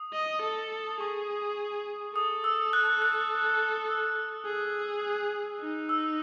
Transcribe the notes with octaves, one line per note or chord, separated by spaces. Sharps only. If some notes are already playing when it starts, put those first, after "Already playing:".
Already playing: D#6
D#5
A4
D#6
G#4 C#6
A4 D#6
E6
F#6
F#6
E6
G#4
D#4
E6